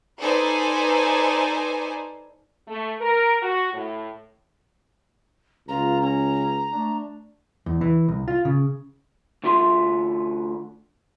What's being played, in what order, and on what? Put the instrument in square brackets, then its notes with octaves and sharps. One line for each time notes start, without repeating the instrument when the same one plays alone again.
[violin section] D#4 A4 B4 C5 D5 G#5
[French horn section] A3
A#4
F#4
A2
[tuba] C#2 [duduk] F4 [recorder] A#5
[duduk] C#4 [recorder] A#5
[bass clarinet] A3 [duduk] D4
[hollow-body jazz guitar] E2
E3
C2
F4
C#3
[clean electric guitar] D2 D3 F4 E5 C6